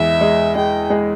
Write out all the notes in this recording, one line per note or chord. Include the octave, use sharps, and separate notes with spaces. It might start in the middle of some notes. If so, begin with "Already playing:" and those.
Already playing: E2 G#3 E5
G#3
G#3 G5
G#3